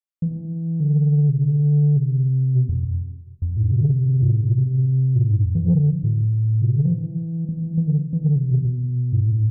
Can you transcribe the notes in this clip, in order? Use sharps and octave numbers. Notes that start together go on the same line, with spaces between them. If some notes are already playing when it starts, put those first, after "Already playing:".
E3
D3
C3
D3
C3
B2
F2
F2
A2
C3
D3
C3
G2
A2
C3
C3
A2
G2
F2
E3
F3
D3
A2
C3
D3
F3
E3
E3
E3
D3
E3
D3
C3
B2
B2
G2
A2